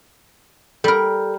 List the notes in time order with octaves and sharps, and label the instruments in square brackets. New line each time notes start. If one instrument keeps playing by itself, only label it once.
[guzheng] G3 A#4 [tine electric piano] A4